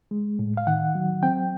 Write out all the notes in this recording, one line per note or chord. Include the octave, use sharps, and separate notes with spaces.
G#3
A2
F5
D#3 F#5
F#3
C4 G5